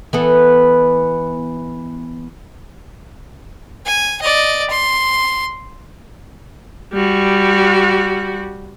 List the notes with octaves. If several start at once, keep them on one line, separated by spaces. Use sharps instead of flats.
E3 B3 A4
G#5
D5 D#5
C6
G3 F#4